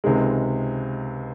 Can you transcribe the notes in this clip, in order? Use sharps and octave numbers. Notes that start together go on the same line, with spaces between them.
C#2 C3 D#3 G#3